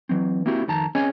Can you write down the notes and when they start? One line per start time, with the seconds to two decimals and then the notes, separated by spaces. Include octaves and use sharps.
0.09 E3 F#3 C4
0.46 A#3 C4 E4 F#4 G4
0.68 F2 D#3 A5 A#5
0.95 C4 C#4 G#4 C#5 D#5 G#5